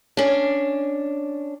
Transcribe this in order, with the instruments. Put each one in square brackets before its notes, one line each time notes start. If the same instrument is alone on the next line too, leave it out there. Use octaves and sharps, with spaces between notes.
[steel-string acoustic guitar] C#4 D4